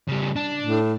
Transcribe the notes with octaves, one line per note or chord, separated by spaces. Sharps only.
C#3 G3
D4
A2